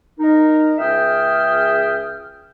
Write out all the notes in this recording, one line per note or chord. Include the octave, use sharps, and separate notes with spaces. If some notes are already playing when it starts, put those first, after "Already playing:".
D#4 A#4
C#2 G#4 E5 G5 D#6 F6